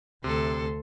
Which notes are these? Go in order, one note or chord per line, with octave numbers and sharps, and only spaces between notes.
D2 C3 A4 C6